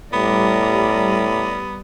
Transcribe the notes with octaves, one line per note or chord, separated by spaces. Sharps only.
A2 G3 B3 D5 A#5